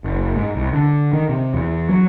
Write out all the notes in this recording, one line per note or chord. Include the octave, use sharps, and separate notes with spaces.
F#1
G#2
C2
D3
D#3
C3
E2
F#3